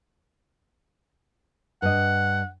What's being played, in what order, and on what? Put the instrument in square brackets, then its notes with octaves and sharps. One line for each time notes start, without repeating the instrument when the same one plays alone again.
[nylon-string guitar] G2 D#5 [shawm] F#5